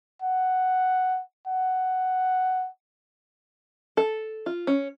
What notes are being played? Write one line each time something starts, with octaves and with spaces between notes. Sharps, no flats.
F#5
F#5
A4
F4
C#4